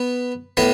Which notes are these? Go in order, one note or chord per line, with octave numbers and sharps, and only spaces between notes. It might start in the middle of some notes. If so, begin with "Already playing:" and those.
Already playing: B3 B4
A2 B3 B4